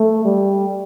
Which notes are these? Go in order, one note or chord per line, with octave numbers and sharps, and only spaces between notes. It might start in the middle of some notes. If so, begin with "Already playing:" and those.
Already playing: A3
G3